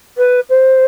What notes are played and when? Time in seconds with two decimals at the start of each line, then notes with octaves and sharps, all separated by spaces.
0.17 B4
0.49 C5